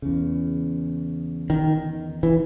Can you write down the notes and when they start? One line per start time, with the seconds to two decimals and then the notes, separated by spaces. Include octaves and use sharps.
0.02 E2 C#3
1.50 D#3
2.23 E3